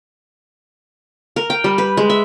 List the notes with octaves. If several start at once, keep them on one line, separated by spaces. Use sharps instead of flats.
A#4
G5
G3
B4
G#3
E5